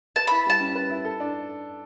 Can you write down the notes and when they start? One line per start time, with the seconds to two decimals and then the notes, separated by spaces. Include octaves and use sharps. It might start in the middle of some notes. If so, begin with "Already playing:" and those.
0.16 B4 A5
0.27 E4 B5
0.46 G3 A5
0.60 C#4
0.75 B4
0.90 E4
1.05 A4
1.20 D4